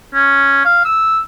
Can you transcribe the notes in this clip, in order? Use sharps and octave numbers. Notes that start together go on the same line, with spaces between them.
C#4
F5
E6